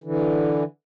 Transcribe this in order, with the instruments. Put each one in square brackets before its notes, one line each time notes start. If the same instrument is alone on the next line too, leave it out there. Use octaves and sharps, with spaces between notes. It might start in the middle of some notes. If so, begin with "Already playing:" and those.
[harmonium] D3 E3